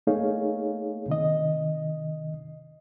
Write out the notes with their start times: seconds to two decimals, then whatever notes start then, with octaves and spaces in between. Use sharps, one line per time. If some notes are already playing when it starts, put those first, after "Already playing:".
0.07 A3 A#3 D#4 G#4 C#5 F5
1.08 C3 D#3 D#5